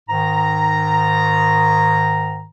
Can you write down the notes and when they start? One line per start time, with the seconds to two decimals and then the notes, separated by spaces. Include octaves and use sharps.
0.09 G#2 D#3 A#5